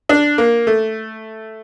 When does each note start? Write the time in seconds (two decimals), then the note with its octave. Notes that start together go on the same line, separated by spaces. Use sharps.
0.09 D4
0.38 A#3
0.67 A3